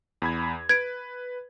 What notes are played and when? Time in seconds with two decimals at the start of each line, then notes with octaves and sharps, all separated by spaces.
0.22 E2 B5 G#6
0.69 B4 G#6 D7